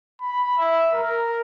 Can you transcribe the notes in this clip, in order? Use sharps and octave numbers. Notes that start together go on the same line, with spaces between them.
B5
E5
A#4